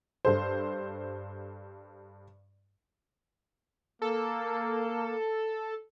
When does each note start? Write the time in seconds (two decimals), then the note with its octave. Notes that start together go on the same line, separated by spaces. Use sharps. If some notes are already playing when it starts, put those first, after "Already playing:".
0.25 G2 A4 C5
4.02 A#3 A4